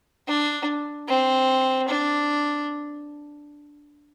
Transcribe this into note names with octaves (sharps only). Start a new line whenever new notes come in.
D4
C4
D4